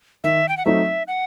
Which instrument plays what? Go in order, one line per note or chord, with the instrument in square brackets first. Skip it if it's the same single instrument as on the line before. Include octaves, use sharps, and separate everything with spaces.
[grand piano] D#3 [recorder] E5
[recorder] G5
F#5
[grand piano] F#3 A3 C4 D#4 [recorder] E5
[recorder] F#5